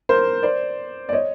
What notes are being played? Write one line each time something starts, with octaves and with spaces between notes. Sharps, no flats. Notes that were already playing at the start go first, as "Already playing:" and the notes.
A#4 C5
C5 D5
D5
C#5 D#5